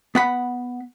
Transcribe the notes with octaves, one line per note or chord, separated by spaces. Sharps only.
B3 F#5 B5